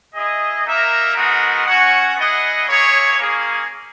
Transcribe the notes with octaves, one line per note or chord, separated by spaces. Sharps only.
E4 G#4 D#5
A#3 D#4 A#4 E5
G#3 B3 D#4 F#4 A#4
C#4 F#4 C#5 F#5
B3 E4 G#4 D#5 F#5
A#3 E4 G#4 C#5
A#3 C#4 G#4